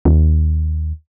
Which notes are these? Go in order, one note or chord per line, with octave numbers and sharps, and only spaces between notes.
D#2